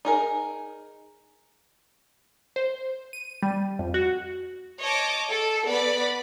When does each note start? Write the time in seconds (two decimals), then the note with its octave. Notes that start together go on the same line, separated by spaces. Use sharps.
0.05 D#4 G#4 A#4
2.56 C5
3.13 D#7
3.43 G3
3.79 F2
3.94 F#4
4.83 C#5 D#5 A5 D6
5.29 A4
5.67 B3 B4 D5 B5